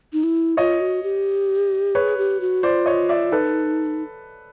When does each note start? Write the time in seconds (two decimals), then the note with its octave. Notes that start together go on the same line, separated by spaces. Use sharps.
0.13 D#4
0.23 E4
0.57 F4 C#5 D#5
0.80 F#4
1.03 G4
1.95 G#4 B4 C#5
2.18 G4
2.41 F#4
2.63 F4 C5 D5
2.86 C#5 D#5
3.09 D5 E5
3.32 D#4 A4 B4